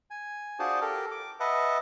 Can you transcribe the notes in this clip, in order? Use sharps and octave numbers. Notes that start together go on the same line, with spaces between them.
G#5
D4 F4 F#4 G#4 C5 A5
G4 A4 A#4
D6
B4 D#5 E5 F#5 A5